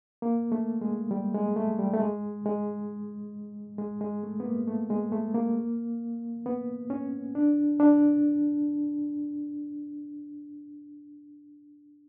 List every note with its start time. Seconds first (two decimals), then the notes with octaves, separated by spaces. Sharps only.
0.22 A#3
0.52 A3
0.81 G#3
1.11 G3
1.34 G#3
1.56 A3
1.79 G3
1.94 A3
2.00 G#3
2.45 G#3
3.78 G#3
4.01 G#3
4.24 A3
4.40 B3
4.45 A#3
4.67 A3
4.90 G#3
5.12 A3
5.35 A#3
6.46 B3
6.90 C#4
7.35 D4
7.80 D4